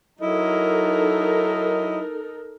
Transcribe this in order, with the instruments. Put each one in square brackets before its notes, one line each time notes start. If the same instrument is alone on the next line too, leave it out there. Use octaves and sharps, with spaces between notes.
[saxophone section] F#3 E4 D#5 [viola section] D#4 A4 A#4